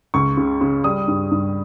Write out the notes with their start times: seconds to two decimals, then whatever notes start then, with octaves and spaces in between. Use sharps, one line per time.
0.14 C#2 C#6
0.37 C#3
0.61 C#3
0.84 G3 D#6
1.08 G2
1.31 G2